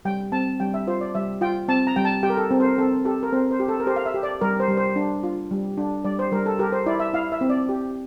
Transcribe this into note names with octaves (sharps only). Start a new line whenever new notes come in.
G3 G5
C4 A5
G3 G5
E5
F4 C5
D5
G3 E5
F4 G5
C4 A5
A#5
G3 G5
A5
G4 G5
A#4
A4
C4
C5
A#4
C4 A4
G4 A4
A#4
C4 C5
C5
G4
A4
A#4
G4 C5
F5
E5
G4
D5
G3 A#4
C5
G3
C5
D4
F4
G3
D4
G3 D5
C5
G3 A#4
A4
G4 A#4
C5
E4 D5
E5
E4 F5
E5
C4
D5
G4